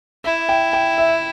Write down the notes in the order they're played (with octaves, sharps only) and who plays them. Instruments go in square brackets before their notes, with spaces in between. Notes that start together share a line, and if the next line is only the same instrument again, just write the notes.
[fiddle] E4 [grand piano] E5
[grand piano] G5
G5
E5